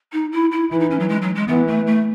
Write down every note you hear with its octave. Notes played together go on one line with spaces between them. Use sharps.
D#4
E4
E4
E3 E4
D#4
C#4
F#3
G#3
F#3
G#3
E3 B3
A3
A3